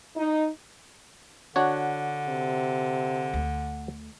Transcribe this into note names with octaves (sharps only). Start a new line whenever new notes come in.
D#4
D3 D4 F#4 C#5
C3
D2